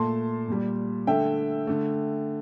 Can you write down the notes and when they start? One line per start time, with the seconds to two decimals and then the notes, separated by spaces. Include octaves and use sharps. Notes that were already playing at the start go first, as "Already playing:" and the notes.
Already playing: A#2 A3 A5 C6
0.48 A#2 G3
1.07 D3 A3 E5 G5
1.67 D3 A3